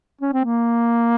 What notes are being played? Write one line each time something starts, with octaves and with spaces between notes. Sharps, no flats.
C#4
C4
A#3